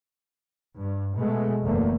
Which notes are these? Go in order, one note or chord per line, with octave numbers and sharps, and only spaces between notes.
G2
B2 G#3 A3
F#1 E2 A3 A#3